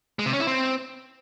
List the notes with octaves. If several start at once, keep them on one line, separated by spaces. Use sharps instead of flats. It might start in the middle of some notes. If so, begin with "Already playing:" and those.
G#3
C3
C#4
E4
C4